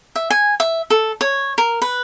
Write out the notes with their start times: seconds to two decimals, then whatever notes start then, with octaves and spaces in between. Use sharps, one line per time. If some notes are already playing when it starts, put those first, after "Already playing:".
0.16 E5
0.30 G#5
0.60 E5
0.90 A4
1.21 C#5
1.58 A#4
1.82 B4